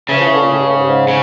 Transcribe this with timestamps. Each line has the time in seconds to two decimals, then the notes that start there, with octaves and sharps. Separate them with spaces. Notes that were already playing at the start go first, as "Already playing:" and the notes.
0.09 C#3 E3
0.17 F3
0.25 E3
0.33 D3
0.41 A#2
0.50 A2
0.58 G2
0.67 A2
0.74 G#2
0.80 G2
0.87 G#2
1.08 C#3